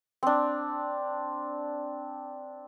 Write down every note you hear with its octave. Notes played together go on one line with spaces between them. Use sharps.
C4 D4